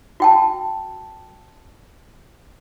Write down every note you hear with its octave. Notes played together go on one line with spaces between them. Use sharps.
F#4 G5 A5